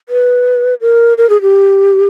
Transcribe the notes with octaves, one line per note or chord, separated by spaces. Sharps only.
B4
A#4
A#4
G#4
G4